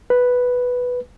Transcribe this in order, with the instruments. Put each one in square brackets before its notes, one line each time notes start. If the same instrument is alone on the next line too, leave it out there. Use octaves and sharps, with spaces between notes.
[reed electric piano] B4